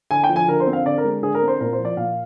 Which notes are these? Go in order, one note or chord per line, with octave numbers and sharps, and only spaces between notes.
D3 G#5
G5
F3
G#5
D3 A#4
C5
C4
F5
D3 D5
A#4
G#3
D3 G#4
A#4
C4
C5
A#2 A#4
C5
F3
D5
A#2 F5